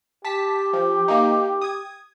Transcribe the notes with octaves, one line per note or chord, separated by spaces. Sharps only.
G4 A5 B6
F3
A#3 D#4
D#6 G#6